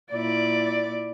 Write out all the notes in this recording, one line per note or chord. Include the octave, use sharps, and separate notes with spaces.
A#2 E4 D5